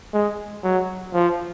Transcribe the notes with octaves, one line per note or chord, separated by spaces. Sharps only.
G#3
F#3
F3